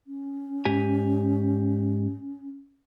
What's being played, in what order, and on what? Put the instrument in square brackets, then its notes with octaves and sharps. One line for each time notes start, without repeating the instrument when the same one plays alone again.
[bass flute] C#4
[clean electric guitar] G#2 G4 G#5